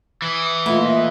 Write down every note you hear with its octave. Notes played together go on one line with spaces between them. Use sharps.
E3 D6 D#6 C#7
A#2 A3 B3 E4 F4 D#5